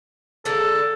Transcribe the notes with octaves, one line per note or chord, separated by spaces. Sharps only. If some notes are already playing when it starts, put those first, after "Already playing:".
D3 G#3 A#3 A4